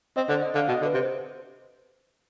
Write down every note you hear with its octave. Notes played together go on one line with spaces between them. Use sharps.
C4 D#5
D3 C5
D#5
D3 F5
B2 D#5
D3
B4
C3
C5